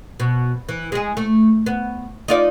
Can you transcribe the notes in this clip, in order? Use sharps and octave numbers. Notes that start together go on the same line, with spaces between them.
B2
E3
G#3 G#4
A3
B3
D#4 F4 D5